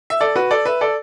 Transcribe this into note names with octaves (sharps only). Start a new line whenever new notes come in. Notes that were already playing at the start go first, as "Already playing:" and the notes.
E5
A4 D5
F#4 B4
A4 D5
B4 E5
A4 D5